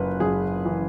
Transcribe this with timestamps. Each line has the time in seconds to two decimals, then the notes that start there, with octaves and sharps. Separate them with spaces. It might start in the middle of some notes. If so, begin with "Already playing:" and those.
Already playing: F#1 F#2 B4
0.20 F#1 G#4
0.65 E3